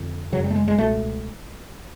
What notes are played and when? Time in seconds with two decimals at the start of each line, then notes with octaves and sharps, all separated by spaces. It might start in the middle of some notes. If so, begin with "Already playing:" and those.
Already playing: F2 D3
0.32 F#2 C#3 F#3
0.44 G3
0.50 A3
0.56 G#3
0.68 G#3
0.78 C#2 B2 A3